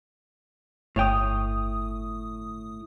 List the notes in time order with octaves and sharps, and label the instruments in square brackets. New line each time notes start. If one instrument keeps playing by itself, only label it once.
[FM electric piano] G1 D#6 [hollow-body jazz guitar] A2 C#5 G5